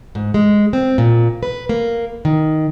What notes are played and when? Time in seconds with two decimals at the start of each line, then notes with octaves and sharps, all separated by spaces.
0.15 G#2
0.34 G#3
0.73 C4
0.98 A#2
1.43 B4
1.69 A#3
2.25 D#3